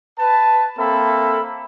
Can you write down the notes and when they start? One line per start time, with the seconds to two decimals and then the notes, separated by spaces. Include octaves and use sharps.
0.19 B4 A5
0.78 A#3 C4 A4 E5 B5